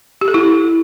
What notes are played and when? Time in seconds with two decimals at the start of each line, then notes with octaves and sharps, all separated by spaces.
0.21 G4
0.28 A4
0.34 E4